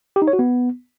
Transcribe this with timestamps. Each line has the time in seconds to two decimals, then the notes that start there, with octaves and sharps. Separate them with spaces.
0.16 G4
0.22 D#4
0.28 C#5
0.33 F#4
0.39 B3